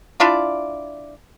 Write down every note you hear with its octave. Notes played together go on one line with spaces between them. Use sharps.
D4 E4 F4 D5